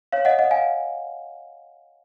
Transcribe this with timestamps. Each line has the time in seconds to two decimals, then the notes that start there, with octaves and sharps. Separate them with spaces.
0.12 C#5 F5
0.25 D#5 F#5
0.39 D#5 F#5
0.51 F5 G#5